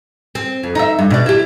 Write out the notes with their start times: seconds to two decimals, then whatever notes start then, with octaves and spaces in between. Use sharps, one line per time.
0.35 C4
0.63 F2
0.75 D#4 E5
0.99 G2
1.10 B2 D5
1.26 E4 G4